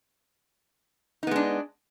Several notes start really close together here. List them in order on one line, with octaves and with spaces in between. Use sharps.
D#4 B3 G#3 D4